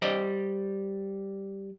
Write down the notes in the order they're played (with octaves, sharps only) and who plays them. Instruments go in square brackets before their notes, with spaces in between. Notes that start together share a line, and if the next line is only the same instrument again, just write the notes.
[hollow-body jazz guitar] G3 C5 D5 D#5